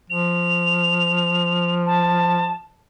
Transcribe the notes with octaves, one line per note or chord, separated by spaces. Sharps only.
F3 F7
A5